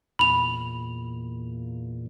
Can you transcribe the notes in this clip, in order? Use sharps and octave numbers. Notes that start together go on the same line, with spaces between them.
E2 A#2 B5 F7